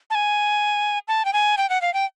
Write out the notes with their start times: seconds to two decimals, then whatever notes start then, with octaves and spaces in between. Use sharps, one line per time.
0.10 A5
0.15 G#5
1.08 A5
1.25 G5
1.33 G#5
1.58 G5
1.70 F#5
1.82 F5
1.94 G5